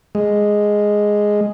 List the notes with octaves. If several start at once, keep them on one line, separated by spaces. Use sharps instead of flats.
G#3